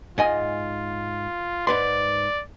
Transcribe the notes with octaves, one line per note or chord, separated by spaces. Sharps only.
G#2 F4 D#5 G#5
G#2 B4 D5 C6